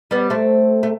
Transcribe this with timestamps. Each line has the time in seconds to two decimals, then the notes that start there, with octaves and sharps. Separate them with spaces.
0.11 G3 B3
0.30 A3 C4
0.83 A3